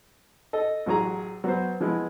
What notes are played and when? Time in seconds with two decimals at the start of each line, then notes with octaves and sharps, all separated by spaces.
0.53 A4 D#5
0.86 A1 F#3 F#4 G#4 A#5
1.44 F#3 B3 C5
1.80 F3 G#3 B3 E4